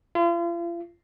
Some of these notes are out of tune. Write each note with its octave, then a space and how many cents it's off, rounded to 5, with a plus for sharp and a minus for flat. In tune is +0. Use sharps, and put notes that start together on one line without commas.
F4 -40